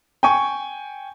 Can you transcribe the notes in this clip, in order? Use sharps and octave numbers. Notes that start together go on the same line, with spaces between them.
G5 G#5 C#6